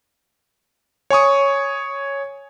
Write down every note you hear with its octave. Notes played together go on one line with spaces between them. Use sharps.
C#5 G#5 C#6 D#6